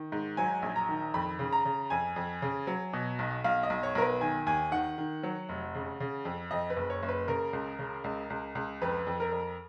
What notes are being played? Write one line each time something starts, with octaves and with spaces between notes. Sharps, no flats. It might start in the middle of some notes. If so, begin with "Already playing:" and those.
Already playing: D#3
G#2
F#3 G#5
A#1
A#5
D#3
F2 B5
C#3
A#5
C#3
F2 G#5
F2
C#3
F#3
B2
B1
B1 F5
D#5
B1
C#5
B1 A#4
B4
D#3 G#5
D#2 G#5
D#3 F#5
D#3
F#3
F1
C#3
C#3
F2
F2 D#5
B4
F#1
C#5
F#1
B4
C#3 A#4
C#2
C#3
C#2
C#2
C#2
F2 B4
F2
A#4
F2